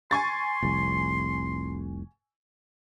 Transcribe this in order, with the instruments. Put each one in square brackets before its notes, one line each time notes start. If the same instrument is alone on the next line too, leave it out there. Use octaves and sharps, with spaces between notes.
[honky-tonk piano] G#5 C#6 A6 [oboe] C6
[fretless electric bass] F1 C2